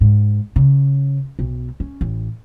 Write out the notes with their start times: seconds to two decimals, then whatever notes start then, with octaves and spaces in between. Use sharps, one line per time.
0.01 G#2
0.56 C#3
1.39 B1
1.80 C#4
2.01 A1